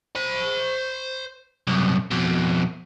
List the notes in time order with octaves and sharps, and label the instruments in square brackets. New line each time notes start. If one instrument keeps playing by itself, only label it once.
[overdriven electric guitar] C5 B5
C2 F#2
F2 B2